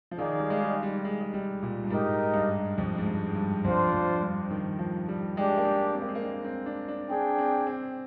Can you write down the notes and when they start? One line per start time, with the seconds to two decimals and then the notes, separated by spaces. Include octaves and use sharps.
0.11 F3
0.18 D#3 D#4 G#4 D5 F5
0.40 G3
0.50 G#3
0.62 G3
0.83 G3
1.05 G#3
1.21 G#3
1.34 G3
1.63 A#2
1.84 G2
1.90 G#2 D#4 G4 A#4 D#5
2.34 G2
2.78 F2
2.98 G#2
3.06 G2
3.26 G#2
3.35 G2
3.64 F2 D4 F4 C5
3.93 F2
4.22 G2
4.51 D#3
4.79 F3
5.08 G3
5.37 G#3 D4 G4 D5 G5
5.57 A#3
5.65 G#3
5.95 C4
6.02 A#3
6.08 G#3
6.15 A#3
6.23 D4
6.44 C4
6.66 D4
6.88 D4
7.10 C4 D4 G#4 D5 G5
7.38 C4
7.67 C4